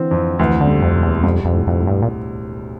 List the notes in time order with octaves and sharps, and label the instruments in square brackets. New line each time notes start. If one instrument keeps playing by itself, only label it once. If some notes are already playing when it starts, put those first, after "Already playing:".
Already playing: [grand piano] D3 C4 [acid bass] E3
[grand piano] F2
[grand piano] D2 [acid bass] E3
[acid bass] D3
[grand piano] G3
[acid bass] F2
[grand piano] E1
[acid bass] E2
[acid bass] F2 [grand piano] G3
[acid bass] F2
[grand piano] A2
[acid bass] F2
[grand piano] A2
[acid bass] G2
A#2